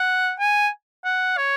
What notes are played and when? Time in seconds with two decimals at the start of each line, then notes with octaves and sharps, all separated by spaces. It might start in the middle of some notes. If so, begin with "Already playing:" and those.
Already playing: F#5
0.39 G#5
1.05 F#5
1.37 C#5